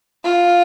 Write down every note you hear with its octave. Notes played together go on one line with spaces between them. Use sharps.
F4